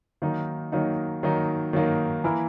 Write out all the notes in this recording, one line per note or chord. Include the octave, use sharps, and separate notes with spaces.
D#3 F#3 A#3 D#4
D#3 F#3 A#3 D#4
D#3 F#3 A#3 D#4
D#3 F#3 A#3 D#4
E3 A#3 E4 A#4